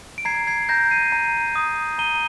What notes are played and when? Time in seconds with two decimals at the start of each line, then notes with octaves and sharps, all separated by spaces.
0.18 D7
0.25 A#5 G#6 C7
0.47 G#6 C7
0.69 A#5 G6 A#6
0.91 C7 D#7
1.12 A#5
1.56 D#6
1.99 A#5 D#7 G7